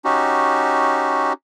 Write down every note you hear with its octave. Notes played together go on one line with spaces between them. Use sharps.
C#4 D#4 F#4 G4